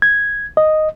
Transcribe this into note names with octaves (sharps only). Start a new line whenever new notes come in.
G#6
D#5